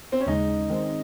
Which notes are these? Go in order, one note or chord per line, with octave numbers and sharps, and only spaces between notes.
C4
C#4
D#2 C#3 G#3 D#4
D#3 G#3 C4